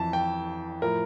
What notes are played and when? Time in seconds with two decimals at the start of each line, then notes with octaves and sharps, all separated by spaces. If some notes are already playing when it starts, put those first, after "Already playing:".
Already playing: F2 E3 A5
0.13 G5
0.82 A2 F3 A#4